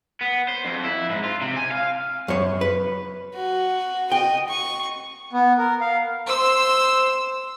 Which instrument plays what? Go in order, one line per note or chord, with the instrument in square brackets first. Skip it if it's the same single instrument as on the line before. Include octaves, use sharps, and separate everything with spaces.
[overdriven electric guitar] B3
C5
F2
E4
G#2
F4
C3
G#5
F5
[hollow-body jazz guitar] F#2 C#5
B4
[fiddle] F#4
[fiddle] D#5 [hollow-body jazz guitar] G5
[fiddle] C#6
[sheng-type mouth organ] B3
A#4
F5
[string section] C5 E6